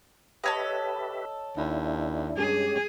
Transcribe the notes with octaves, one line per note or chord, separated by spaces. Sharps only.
G4 A4 B4 C#5 D#5 E5
D#2 D4 E4
G2 G#3 C#4 G4 G#4